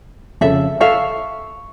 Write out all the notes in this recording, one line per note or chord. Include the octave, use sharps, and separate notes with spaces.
F2 C#3 A4 E5
A4 E5 F5 C#6